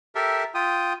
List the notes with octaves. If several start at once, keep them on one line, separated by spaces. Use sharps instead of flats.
G4 A4 A#4 E5
F4 G5 D#6